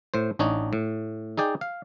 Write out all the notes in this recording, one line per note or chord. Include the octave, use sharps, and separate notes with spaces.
A2 C5
A1 D4 D#4 C#5
A2
D#4 G#4 D5 G5
F5